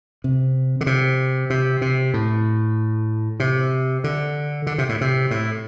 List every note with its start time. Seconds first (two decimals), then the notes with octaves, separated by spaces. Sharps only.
0.24 C3
0.81 D3
0.87 C3
1.50 C3
1.81 C3
2.14 A2
3.40 C3
4.04 D3
4.67 D3
4.78 C3
4.89 A2
5.01 C3
5.31 A2